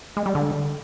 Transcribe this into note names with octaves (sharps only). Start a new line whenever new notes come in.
G#3
G3
D3